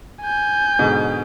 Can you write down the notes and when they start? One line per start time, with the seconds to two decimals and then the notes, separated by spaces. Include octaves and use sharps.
0.22 G#5 G6
0.79 G#2 B2 D3